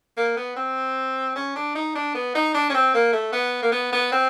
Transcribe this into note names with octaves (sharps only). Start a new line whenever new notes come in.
A#3
B3
C4
C#4
D4
D#4
D4
B3
D#4
D4
C#4
C4
A#3
A3
B3
A#3
B3
B3
C4